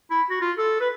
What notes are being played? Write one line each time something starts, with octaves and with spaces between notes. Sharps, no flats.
E4
F#4
F4
A4
B4